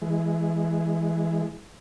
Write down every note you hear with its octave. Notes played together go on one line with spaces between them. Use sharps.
E3 G#3